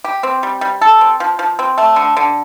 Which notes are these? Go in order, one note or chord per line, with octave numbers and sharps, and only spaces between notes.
G4
C4
G3
G3
A4
C4
F3
F3
C4
A3
D3
D3